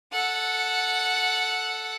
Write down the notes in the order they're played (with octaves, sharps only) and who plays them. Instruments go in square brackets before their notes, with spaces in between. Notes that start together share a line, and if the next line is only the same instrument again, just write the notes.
[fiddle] A4 F#5